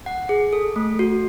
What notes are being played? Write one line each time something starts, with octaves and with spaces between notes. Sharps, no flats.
F#5
G#4
A4
A3
F#4